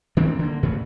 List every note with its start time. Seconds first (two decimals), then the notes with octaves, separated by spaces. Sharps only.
0.17 D#3 E3 C4 D4
0.39 D3 A#3
0.63 A#2 C#3 A3